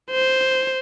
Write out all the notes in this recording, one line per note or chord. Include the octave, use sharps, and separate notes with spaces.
C5